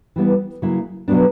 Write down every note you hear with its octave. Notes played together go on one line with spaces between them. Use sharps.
E3 G3 B3 E4
C#3 F#3 A#3 E4
B2 F#3 B3 D4